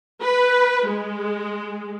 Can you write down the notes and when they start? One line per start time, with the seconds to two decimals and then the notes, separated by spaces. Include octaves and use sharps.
0.22 B4
0.88 G#3